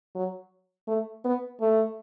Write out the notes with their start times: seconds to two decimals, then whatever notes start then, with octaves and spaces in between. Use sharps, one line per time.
0.15 F#3
0.88 A3
1.25 B3
1.61 A3